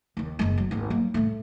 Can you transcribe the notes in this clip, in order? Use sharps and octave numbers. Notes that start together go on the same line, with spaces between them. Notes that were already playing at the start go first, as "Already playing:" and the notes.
D#2 D#3
F#1 G#3
F#3
G#1 D#2
F#3 A#3
A2 A3